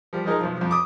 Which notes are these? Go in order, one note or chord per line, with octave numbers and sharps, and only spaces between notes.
F3 G3
F3 G#3 D#4 A#4
B1 F3
F2 F3
D6 D#6